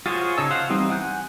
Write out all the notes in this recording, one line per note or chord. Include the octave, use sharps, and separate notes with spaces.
F4 F#4 G#4 C5 C#5
C#3 D#4 C#5 A5 E6
C5 F5 F#5
E3 G3 C4 D#4
F#5 G#5 F#6 G6